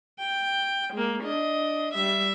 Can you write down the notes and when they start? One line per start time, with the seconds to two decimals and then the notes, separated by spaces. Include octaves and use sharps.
0.19 G5
0.93 G#3 A#3
1.23 D4 D#5
1.94 G3 E5